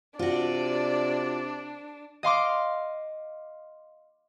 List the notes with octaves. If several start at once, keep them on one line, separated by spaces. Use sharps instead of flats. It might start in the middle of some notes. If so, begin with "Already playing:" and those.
C3 D4 F4 F#4 D5
D#5 F5 C6 D6